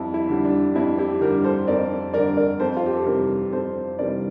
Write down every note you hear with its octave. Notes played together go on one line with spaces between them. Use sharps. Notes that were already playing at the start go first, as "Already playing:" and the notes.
Already playing: F2 G3 E4
E4
D3 G3
D4
F2 E4
E4 G4
D3 G3 G4 A#4
A4 C5
F2 A#4 D5
D3 G3 A#4 D5
A#4 D5
F2 A4 C5
F4
G4
A4
C3 E3 G3 G4 A#4
F2 A4 C5
C3 E3 G3 A#4 D5